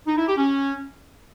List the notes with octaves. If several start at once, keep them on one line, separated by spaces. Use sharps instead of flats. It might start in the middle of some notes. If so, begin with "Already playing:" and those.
D#4
E4
G4
C#4